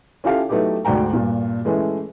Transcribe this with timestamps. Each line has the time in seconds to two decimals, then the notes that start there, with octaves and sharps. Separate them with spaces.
0.24 C#4 E4 F4 G4 A4 F5
0.49 F#3 A3 B3 D#4 E4 G4
0.85 D2 G#2 F#4 D5 G5 A#5
1.13 G2 A#2
1.65 E3 G#3 A3 C#4 E4